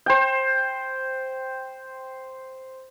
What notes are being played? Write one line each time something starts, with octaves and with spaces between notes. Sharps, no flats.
C5 G5